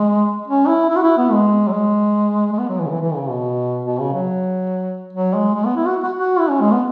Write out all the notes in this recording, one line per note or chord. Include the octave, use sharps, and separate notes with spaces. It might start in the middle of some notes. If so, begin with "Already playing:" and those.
Already playing: G#3
C#4
E4
E4
F#4
E4
B3
G#3
F#3
G#3
G#3
B3
F#3
E3
C#3
E3
E3
C#3
B2
B2
C#3
F#3
F#3
G#3
G#3
B3
E4
F#4
F#4
F#4
E4
C#4
G#3
B3